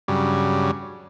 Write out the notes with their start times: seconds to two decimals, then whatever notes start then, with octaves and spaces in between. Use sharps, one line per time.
0.08 G2 C#3 F#3 G3